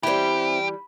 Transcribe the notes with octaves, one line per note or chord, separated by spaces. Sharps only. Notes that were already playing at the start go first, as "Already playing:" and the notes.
E3 G3 C4 E4 G4 B5